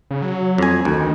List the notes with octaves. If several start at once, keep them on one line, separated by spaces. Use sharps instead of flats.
C#3
F#3
F2 G#5
D2 D#3